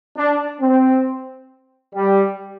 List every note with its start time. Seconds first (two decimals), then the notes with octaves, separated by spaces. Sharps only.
0.16 D4
0.61 C4
1.93 G3